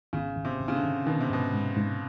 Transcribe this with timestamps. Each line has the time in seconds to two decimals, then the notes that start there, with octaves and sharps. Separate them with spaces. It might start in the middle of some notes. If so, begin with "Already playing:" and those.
0.13 G#1 C#3
0.36 G#1
0.45 C3
0.60 G#1
0.68 C#3
0.75 D3
0.83 G#1
1.07 B2 D#3
1.20 C3
1.29 G#2 B2
1.53 G#2
1.77 G#2